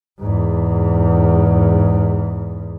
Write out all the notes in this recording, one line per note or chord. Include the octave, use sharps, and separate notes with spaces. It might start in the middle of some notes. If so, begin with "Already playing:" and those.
E2 G#2